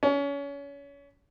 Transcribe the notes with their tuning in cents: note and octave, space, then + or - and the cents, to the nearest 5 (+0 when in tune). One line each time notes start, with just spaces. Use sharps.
C#4 +30